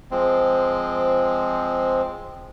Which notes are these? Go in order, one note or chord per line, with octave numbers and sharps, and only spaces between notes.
F3 G#3 C4